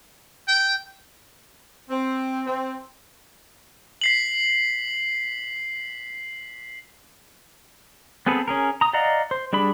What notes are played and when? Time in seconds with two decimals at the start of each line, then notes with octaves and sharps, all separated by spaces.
0.48 G5
1.90 C4
2.47 C4
4.01 B6 C7 F#7
8.26 B3 C4 G#4 A4 B4
8.48 C#4 G#4 A#4
8.81 A#5 D#6
8.93 D5 D#5 F5 F#5 A#5
9.31 C5
9.53 G3 D4 G#4 B5